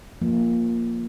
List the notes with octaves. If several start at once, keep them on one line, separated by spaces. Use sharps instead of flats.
F3 A#3